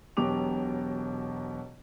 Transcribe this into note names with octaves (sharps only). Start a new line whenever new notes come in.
E1 B2 F#3 G4 D6 F7